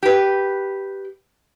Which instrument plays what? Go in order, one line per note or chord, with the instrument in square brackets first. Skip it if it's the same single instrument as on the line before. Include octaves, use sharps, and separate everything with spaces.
[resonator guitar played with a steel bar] G4 B4